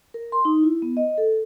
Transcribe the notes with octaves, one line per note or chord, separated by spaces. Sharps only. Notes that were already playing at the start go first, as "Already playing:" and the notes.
A#4
C6
D#4
E4
B3
D#5
A4